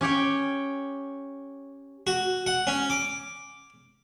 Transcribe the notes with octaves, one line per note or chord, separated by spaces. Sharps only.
C#4 G4 C#5 G5
F#4
F#5
C#4
D6